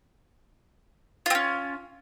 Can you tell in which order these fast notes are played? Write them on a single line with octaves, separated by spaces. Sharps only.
F4 C4 C#4